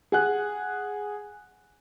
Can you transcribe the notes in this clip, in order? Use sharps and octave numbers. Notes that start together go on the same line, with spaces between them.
G#4 F#5 F#6